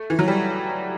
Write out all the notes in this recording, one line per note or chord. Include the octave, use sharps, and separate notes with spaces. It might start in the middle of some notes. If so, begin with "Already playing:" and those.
Already playing: A3
E3
F#3
G3